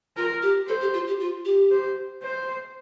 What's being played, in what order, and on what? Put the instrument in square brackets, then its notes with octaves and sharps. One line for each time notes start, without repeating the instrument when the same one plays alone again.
[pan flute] F4 [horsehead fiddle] A#4
[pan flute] G4
[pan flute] A4 [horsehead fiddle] C5
[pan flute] G4
F4
G4
F4
G4
[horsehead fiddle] C5
C5